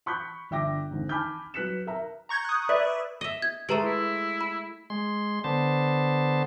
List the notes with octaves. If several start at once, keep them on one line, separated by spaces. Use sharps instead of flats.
B5 C#6 F#6 G6 B6
G1 D4 E5 G5 D6 A#6
G#1 D2
G#5 A5 B5 D6 F6 G6
F#3 B4 F#6 B6 C#7 E7
A#4 E5 A#5
A#5 C#6 G6 G#6
D#6 F#6
B4 D5 E5
D#5 E5
G#6
G#3 A3 G4 B4 A#5
E4
B5
G#3 C6
D3 B3 C5 A5